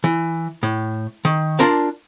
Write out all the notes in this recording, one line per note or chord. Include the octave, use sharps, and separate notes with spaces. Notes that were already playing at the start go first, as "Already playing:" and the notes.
E3
A2
D#3
D4 F4 A#4 D5 A5